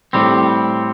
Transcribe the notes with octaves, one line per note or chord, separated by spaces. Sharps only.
A2 G3 C4